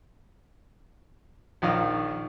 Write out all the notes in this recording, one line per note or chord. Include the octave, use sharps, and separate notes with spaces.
A#1 D#3 F3 F5 D#6